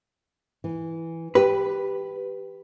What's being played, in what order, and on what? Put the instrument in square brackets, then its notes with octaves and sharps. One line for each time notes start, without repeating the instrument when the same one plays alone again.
[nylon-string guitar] E3
[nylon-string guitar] G4 [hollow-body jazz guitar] B4